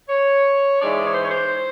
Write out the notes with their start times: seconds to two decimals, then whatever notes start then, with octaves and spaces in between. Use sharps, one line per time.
0.09 C#5
0.81 G#2 E3 G#3 D5
1.06 C#5
1.14 C5
1.22 C#5
1.30 C5